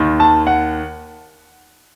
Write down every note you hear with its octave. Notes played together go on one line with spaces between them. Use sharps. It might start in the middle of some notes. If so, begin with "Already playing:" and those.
Already playing: D#2 D#3
A5
F#5